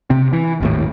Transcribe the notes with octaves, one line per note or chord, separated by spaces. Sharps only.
C3 C4
E3
G#1 D#2 A2